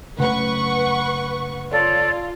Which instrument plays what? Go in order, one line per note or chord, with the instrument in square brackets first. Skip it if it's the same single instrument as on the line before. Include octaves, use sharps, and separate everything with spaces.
[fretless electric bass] F#1 C#3 A3 [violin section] B4 F#5 C#6
[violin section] F4 [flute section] A4 C#5 D5